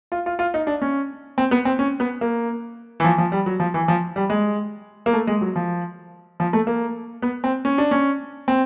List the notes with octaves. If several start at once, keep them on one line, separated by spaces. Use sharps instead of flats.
F4
F4
F4
D#4
D4
C#4
C4
B3
C4
C#4
B3
A#3
E3
F3
F3
G3
F#3
F3
E3
F3
G3
G#3
A#3
A3
G#3
F#3
F3
F3
A3
A#3
B3
C4
C#4
D4
C#4
C4